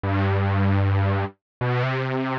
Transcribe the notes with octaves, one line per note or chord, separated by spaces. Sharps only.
G2
B2
C3